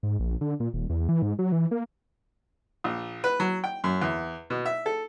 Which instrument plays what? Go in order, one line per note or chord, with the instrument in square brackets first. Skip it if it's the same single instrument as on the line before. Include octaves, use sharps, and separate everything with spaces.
[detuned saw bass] G#2
A#1
D3
A#2
D#1
E2
E3
G#2
F#3
E3
A#3
[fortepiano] A#1
B4
F#3
G5
F#2
E2
B2
E5
A4